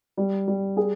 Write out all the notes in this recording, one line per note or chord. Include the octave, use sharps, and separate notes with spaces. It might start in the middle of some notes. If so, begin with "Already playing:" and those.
G3
G3
G#4